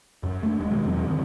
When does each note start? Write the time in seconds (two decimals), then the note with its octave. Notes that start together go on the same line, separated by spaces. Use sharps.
0.23 F#2
0.43 A3 D4
0.58 D#1 G#3
0.71 B2 D#3 G#3
0.85 E2 E3 F#3 C4
1.06 G2 D3 D#3